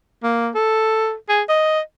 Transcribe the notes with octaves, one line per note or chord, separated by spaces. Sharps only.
A#3
A4
G#4
D#5